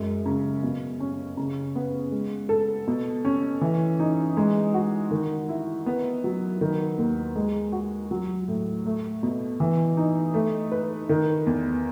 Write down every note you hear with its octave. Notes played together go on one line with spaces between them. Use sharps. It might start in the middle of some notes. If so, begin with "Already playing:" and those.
Already playing: F#2 G#3
C#3
B2
C#4
C#3
B3
G#3
A4
B2
C#4
E3
D#4
G#3
F#4
D#3
E4
B3
F#3
D#3
D#2
G#3
F#4
F#3
A2
A3
B2
E3
D#4
A3
B4
D#3
E2